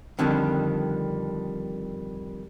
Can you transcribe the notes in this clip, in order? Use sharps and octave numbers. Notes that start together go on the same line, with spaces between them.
F2 D3 D#3 G3 D4